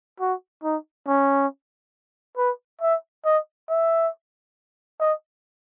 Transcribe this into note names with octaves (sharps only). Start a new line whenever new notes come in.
F#4
D#4
C#4
B4
E5
D#5
E5
D#5